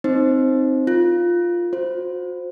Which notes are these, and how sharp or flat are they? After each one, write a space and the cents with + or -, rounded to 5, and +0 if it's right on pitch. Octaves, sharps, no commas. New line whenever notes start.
C4 +0 D#4 +0 C5 +15
F4 +0 A#4 -20
F#4 -40 C5 +0